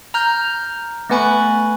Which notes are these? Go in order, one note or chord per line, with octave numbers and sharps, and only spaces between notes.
A#5 F6 G6
A3 B3 B4 G#5 B5 C#6